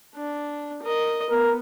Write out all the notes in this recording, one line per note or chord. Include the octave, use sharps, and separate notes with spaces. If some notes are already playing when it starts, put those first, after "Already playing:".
D4
A#4 D#5
B3 A#4